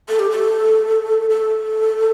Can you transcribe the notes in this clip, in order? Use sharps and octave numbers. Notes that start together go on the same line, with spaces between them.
A4
G4
A4
A4